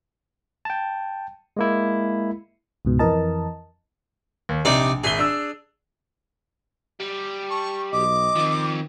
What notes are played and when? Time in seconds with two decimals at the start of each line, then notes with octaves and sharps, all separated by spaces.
0.65 G5 A5
1.57 G#3 A#3 E4
2.85 C#2 G#2 B2
2.99 F2 E3 A#4 D#5 A5
4.49 D#2
4.65 A#1 C3 D#4 D5
5.04 G#1 G#4 E5 G7
5.19 D4 E6
7.00 G3
7.50 A5 C#6
7.93 B1 D#5 D6
8.36 D#3 F3 C4